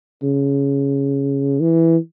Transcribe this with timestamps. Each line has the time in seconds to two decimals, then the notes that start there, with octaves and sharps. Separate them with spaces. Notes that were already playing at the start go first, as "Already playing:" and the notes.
0.23 C#3
1.61 E3